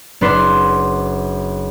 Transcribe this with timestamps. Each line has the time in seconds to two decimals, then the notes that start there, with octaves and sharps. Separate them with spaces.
0.21 F#1 D4 B4 C6